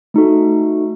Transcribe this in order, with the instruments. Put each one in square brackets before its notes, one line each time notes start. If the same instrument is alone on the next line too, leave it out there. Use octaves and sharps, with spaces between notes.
[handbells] A3 D#4 F#4 A4